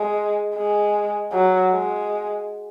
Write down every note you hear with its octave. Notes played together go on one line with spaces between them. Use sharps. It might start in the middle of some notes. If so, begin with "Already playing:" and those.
Already playing: G#3
G#3
F#3
G#3